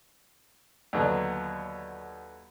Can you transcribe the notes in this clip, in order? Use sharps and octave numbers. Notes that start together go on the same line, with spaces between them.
D#2 D3 F#3 B3